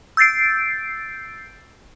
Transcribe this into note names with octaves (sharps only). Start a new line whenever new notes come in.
E6 G6 A6 C7 D7